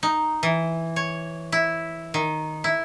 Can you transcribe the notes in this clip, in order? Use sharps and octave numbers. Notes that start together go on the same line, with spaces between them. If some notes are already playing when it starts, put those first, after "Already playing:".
D#4
E3
C#5
E4
D#3
E4